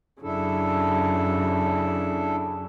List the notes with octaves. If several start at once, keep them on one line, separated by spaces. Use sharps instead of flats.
F#2 C#3 D4 E4 A4